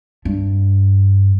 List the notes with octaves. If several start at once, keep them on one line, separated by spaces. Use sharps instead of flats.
G2